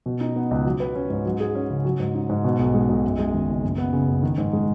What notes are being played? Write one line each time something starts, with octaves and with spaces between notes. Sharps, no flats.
B2
D#4
B3
C#2
F#3
B4
C#4
G#2
F#3
G#4
C#4
C#3
F#3
G#2
D#4
G#2
B2
B1
G#3
B1
F#2
G#3
D#3
F#1
F#2
B3
C#3
F#1
D#3
G#2
G#3